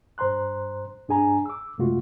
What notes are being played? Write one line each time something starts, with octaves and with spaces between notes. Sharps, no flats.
G2 C5 A#5 C6 F#6
G2 D4 G#4 G#5 A#5
D6 E6
F#2 C3 G#3 A3 F4 F#4